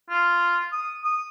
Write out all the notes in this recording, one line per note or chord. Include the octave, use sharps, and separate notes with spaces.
F4
D#6
D#6